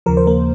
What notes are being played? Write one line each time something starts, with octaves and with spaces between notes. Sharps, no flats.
D#2 C#3 F3 A#4
C5
A#3 A#4